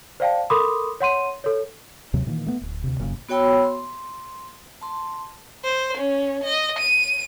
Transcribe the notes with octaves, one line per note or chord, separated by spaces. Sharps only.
C5 D5 F5 G5 A5
A4 A#4 B5 C6 D6 D#6
C#5 F#5 C6 D#7
A4 C#5
D#2 C3 F#3
A#2 D#3 E3 A#3
A3 B3
D1
D2 C3
F1 F#2 A#2 C#3
B3 F#4 C#5 G5 B5 E6
C6
A5 C6
C5
C#4
D#5
D#7